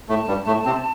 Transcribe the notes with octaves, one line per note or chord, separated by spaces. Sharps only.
A2 A3 A5
G2 G3
A2 A3
C3 C4